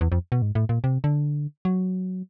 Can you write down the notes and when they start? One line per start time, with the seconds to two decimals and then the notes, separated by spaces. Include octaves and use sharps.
0.01 E2
0.12 F2
0.32 B2
0.42 G#2
0.55 A2
0.69 A#2
0.84 C3
1.04 D3
1.65 F#3